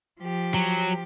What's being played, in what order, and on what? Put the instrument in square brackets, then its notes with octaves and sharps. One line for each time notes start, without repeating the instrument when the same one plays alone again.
[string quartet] F3 G4
[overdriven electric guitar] F#3